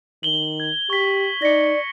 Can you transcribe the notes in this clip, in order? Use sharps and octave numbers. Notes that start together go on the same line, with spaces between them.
D#3 F#7 G7
G#6
G4 C#6 B6
D#4 D5 A#6 C#7